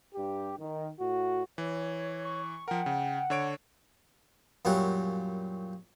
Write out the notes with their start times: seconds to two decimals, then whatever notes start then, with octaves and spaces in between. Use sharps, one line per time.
0.15 G2 G4
0.58 D#3
0.99 A2 F#4
1.58 E3 C#5
2.24 C#6
2.68 F3 A#4 F#5 G5
2.86 C#3
3.30 D3 C#5 D7
4.65 F#2 A#2 G3 C#4 F#5